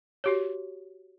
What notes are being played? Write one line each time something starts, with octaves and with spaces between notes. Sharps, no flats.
F#4 G4 C#5